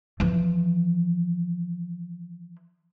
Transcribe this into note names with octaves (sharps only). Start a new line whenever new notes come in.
E3 F3